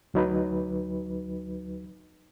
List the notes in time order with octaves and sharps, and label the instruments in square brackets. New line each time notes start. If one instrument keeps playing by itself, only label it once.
[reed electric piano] D2 F#3 D#4 B4